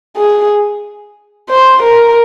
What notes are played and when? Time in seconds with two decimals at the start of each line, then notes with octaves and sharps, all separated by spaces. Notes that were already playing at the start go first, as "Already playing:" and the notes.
0.17 G#4
1.50 C5
1.83 A#4